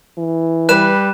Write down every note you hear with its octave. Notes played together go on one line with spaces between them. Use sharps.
E3
G3 B4 F#6 E7